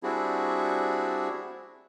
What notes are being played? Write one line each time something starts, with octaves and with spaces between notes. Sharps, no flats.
G3 C4 D4 E4 F#4 G#4